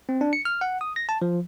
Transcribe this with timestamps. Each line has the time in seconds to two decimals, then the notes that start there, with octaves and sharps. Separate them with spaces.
0.09 C4
0.21 D4
0.33 C#7
0.45 F6
0.61 F#5
0.81 D#6
0.96 A#6
1.09 A5
1.22 F3